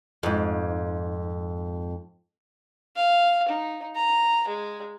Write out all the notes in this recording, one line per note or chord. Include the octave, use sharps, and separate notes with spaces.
F2 G#2
F5
D#4
A#5
G#3